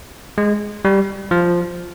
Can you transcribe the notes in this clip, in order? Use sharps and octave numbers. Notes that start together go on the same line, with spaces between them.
G#3
G3
F3